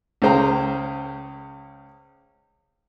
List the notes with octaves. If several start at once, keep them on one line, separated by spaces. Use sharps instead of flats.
C#2 C#3 G#4 C5 G5 A#5